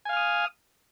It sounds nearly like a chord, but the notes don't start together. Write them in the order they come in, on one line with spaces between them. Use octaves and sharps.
G#5 F5 F6 D#6